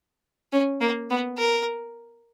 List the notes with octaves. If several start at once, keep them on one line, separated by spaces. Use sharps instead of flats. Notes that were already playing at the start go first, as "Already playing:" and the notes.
C#4
A#3
B3
A#4